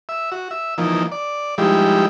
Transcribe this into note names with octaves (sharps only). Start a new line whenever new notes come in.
E5
F#4
E5
E3 F3 A#3 D#4
D5
F3 G3 G#3 D#4 E4 G4